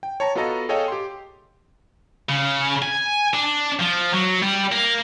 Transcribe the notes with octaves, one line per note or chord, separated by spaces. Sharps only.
G5
C#5 A5 A#5
B3 F4 F#4 A4 D#5 A#5
G#4 A4 C#5 D#5 F5 G5
G4 C6
C#3
G#5
D4
F3
F#3
G3
A#3